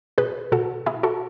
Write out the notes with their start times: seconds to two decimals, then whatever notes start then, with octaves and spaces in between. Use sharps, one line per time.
0.18 B2 G#4 B4
0.52 B2 F#4 A4
0.86 B2 E4 G#4
1.03 F#4 A4